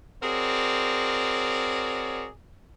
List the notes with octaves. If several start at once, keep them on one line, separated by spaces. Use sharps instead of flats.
C4 F#4 G#4 A#4 C#5 D5